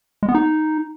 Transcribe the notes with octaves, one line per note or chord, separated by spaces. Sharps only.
G#3
B3
D#4